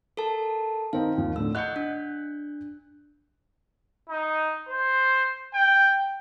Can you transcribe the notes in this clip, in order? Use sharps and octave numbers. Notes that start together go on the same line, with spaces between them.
A4 A#4 A5
D#3 C4 D#4 F5
D#2 F3
A2 D3 E6
D#5 F#5 F#6 G6 C#7
D4
D#4
C5
G5